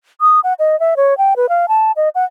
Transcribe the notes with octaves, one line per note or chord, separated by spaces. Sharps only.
D#6
F#5
D#5
E5
C#5
G5
B4
F5
A5
D#5
F#5